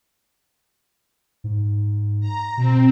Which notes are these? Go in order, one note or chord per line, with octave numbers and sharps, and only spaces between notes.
G#2
A#5
B2 C4